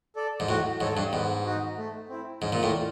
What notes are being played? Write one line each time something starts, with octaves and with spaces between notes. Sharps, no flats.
A4 D5
G#2
A2 F#4
G#2 A4 C#5
G2
G#2 B3
D#4 F#4
A3
C4 E4
G#2 C#4
A#2
A2
F4